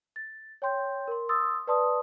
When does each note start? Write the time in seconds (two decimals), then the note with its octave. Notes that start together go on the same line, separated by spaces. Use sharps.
0.16 A6
0.62 C#5 G5 C6 G6
1.08 A#4 C6
1.29 C6 D#6 E6 A6
1.67 B4 D5 A5 C6 D#6